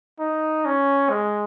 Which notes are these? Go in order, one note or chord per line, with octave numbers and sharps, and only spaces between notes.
D#4
C#4
G#3